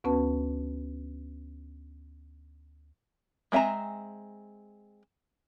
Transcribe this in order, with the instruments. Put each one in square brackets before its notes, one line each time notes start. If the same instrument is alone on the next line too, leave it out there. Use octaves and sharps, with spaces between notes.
[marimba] D2 B3 C#4 F#4 B4 A5
[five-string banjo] G#3 C4 E5 G#5 A#5